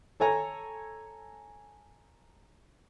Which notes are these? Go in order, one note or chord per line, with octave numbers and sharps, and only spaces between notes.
A4 C#5 G#5 A#5